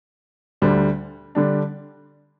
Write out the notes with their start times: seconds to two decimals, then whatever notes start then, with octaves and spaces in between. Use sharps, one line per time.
0.62 D2 D3 G3 D4
1.35 D3 G3 D4